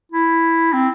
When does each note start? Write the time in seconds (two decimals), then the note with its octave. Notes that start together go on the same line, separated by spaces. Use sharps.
0.12 E4
0.73 C4